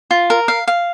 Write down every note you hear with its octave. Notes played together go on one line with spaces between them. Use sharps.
F4
A#4
F5
F5